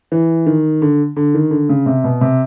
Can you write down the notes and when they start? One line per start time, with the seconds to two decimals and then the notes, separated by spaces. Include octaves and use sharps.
0.12 E3
0.46 D#3
0.82 D3
1.16 D3
1.34 D#3
1.51 D3
1.69 C#3
1.86 C3
2.04 B2
2.21 C3